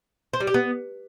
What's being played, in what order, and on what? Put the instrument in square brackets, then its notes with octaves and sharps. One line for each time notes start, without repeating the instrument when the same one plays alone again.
[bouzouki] C5
G3
G4
B3